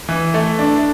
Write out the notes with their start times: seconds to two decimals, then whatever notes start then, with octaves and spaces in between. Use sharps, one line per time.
0.09 E3
0.34 A3
0.59 D4